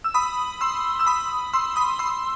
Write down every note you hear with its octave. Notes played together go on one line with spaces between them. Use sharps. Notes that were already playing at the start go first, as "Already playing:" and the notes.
E6
B5 D#6
C6 E6
E6
B5 D#6
C6 E6
B5 D#6
C6 E6